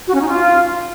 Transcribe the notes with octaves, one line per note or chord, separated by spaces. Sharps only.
F#4
C#4
D#4
F4